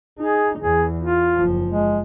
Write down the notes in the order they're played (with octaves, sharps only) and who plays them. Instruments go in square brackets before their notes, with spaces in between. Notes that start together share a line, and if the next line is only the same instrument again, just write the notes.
[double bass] D#4 [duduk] G#4
[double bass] E2 [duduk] G#4
[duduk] F4
[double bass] F#1 F3
[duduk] G#3